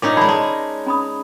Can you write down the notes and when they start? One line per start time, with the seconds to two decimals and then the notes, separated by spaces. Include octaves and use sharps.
0.02 A#2 C#4 D#4 D6
0.17 G#3 G#4 D5 A5 B5
0.29 G#3 A5
0.53 C#5
0.86 C#4 B5 D#6